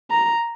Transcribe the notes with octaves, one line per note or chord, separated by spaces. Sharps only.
A#5